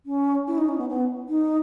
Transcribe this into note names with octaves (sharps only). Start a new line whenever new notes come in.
C#4
E4
D#4
C#4
B3
B3
D#4